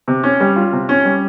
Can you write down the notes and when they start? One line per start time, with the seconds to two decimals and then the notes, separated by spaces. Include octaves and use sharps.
0.08 C3
0.23 C#4
0.40 G3
0.56 F4
0.73 C3
0.89 C#4
1.05 G3